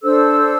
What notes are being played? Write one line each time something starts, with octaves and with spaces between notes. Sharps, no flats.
D4 A4 C5 E6